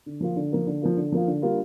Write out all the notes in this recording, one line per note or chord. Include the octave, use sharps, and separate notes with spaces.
D3
F3 A#3 F4
D3
F3 A#3 F4
D3
F3 A#3 F4
D3
F3 A#3 F4
D3
G3 A#3 D4 F4